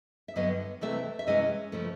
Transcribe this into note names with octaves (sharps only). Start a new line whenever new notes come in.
E5
G2 D3 F#3 B3 D#5
C3 E3 A3 C4 E5
E5
C3 E3 G#3 C#4 D#5
C#3 F3 A3